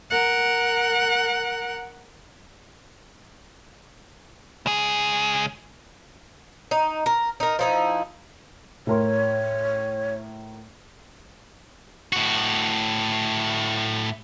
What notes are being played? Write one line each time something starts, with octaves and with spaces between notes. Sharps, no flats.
A#4 F#5
C#2 G#4
D#4
A#4
D#4 A#4
F3 D#4 E4
A2 A#4 C#5 C6
A2 F#4